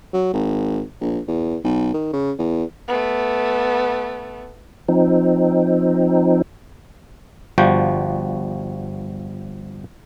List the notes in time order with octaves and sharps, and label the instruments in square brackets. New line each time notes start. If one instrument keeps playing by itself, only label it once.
[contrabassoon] F#3
G#1
A#1
E2
B1
D#3
C#3
E2
[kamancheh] A3 B3
[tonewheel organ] F3 C4 D#4
[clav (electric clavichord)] G1 F3 G3 F#4 G5